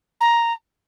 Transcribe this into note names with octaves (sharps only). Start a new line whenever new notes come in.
A#5